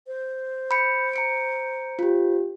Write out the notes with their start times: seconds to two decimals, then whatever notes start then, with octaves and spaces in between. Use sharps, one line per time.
0.07 C5
0.71 B5 G6 C#7
1.13 A#5 C#7 D7
1.99 F4 G4